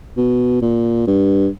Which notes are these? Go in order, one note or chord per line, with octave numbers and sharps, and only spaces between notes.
B2
A#2
G2